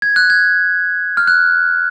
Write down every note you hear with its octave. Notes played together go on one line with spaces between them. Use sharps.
G#6
F#6
G#6
F6
F#6